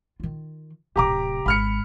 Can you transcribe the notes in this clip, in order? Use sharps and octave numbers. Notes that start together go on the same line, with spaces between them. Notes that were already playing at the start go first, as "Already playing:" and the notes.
D#3 F4
D1 C3 G4 A#5 D6
G#1 B5 F6 C#7